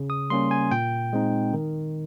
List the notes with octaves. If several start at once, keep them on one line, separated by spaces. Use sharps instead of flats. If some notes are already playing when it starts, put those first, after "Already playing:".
Already playing: C#3
D#6
G3 A#3 C#4 C6
G#5
A#2 G5
G#3 C4 D#4
D#3